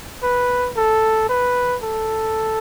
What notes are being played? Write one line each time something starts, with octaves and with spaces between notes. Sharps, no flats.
B4
A4
B4
A4